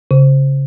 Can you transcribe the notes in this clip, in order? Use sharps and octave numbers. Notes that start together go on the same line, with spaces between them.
C#3